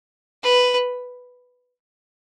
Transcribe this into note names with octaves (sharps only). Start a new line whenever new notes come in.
B4